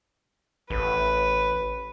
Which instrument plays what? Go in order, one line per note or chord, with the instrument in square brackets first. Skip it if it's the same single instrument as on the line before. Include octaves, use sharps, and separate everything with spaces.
[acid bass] A1 [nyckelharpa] B4